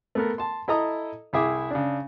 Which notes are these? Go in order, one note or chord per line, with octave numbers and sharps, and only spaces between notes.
A3 B3 A#4
A5 C6
E4 A4 D#5 A#5 D#6
C2 E4 G#4 E5 D6
C#3 D4